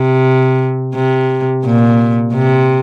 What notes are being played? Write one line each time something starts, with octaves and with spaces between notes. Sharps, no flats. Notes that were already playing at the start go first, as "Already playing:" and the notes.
Already playing: C3
C3
A#2
C3